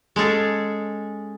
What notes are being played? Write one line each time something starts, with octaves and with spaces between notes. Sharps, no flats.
G#3 C#4 G#4 A4